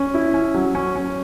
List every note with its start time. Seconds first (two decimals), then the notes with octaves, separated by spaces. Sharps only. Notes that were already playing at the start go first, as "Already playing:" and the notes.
Already playing: C#4
0.14 E4
0.34 C#4
0.54 F#3
0.75 C#4
0.96 C#4